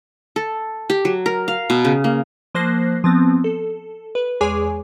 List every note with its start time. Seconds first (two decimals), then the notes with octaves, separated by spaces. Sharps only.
0.36 A4
0.90 G4
1.05 F#3
1.26 A#4
1.48 F5
1.70 B2
1.85 C#3
2.04 A#3
2.55 F3 A#3 C5 F#6 A#6 C7
3.04 F3 B3 C4
3.44 A4
4.15 B4
4.41 E2 G#3 G#4 C#5 G#5 D6